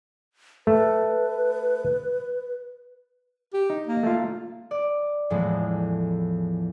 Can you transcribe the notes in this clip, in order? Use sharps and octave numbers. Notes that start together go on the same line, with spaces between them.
A3 B4
G4
D#4
A#3
A3 F4
D5
E2 A2 F3 G#3 A3 B3